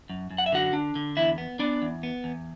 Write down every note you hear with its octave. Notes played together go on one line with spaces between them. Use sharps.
F#2
F#2
F#5
E5
D3 F#4 F#5
D4
D3
E2 E4 E5
B3
B3 D4 D5
E2
B3
E2